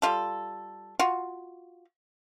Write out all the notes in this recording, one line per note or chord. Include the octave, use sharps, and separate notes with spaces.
G3 F4 A4
F4 F#4